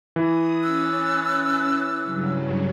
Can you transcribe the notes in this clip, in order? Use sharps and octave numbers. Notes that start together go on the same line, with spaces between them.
E3 D#6
C#4 E6 F#6 A6
G2 C#3 F#3